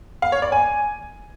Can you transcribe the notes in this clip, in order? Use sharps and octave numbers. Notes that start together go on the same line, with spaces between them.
F5
C#5
D5
G#5